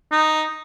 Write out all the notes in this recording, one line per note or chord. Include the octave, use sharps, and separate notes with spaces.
D#4